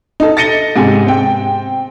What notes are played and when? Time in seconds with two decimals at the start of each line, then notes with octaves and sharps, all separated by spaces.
0.20 D#4 A4
0.37 A6 A#6 C#7 D#7 G7
0.76 G#2 C3 G#5
1.07 C4 G5